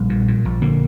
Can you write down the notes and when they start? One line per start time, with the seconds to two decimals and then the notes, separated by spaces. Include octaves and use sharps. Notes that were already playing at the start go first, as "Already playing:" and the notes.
Already playing: A#1 G3
0.10 A#2
0.28 A#2
0.45 A#1
0.61 D3 A#3